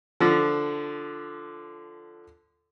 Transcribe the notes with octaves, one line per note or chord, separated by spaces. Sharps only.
D3 F3